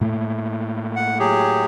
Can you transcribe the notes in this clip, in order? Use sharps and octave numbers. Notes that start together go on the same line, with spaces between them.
A2 A3 A#3
F#5
F#3 G4 G#4